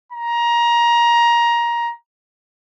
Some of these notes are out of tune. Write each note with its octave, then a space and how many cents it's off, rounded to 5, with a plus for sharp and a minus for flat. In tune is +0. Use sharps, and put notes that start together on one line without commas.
A#5 +20